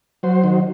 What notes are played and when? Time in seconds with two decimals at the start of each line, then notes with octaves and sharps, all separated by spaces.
0.23 F#3 C5
0.44 D#3